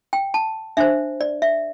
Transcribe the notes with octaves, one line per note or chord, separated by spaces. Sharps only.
G5
A5
D4 C5 E5
D5
E5